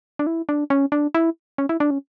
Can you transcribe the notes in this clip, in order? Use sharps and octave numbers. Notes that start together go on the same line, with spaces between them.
D4
E4
D4
C#4
D4
E4
C#4
E4
D4
C#4